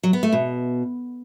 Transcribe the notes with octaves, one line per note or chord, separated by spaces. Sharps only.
F#3
B3
A3
B2